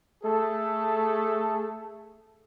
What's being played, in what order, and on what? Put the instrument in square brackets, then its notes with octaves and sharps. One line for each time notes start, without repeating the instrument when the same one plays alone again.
[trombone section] A3 G#4 A4